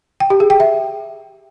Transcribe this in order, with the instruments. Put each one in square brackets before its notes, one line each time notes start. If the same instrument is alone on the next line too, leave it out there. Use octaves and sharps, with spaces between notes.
[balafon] G5
G4
G#4
G5
E5